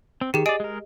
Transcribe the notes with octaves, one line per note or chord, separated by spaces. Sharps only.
C4
D#3 G4 G#4
G#4 D5 D#5 D7
G#3 A#4